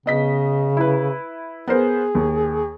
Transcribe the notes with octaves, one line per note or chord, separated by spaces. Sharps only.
C#3 B3 D#5 B6
E4 B4
B3 G#4 A#4 C5
D#2